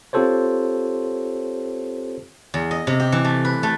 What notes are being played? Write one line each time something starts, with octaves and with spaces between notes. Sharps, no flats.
C4 F4 G4 A4 C5 C#5
E2
D#5
C3
G4
E3
A3
B4
A3